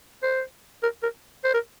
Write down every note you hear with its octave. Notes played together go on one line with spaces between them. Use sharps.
C5
A#4
A#4
C5
A#4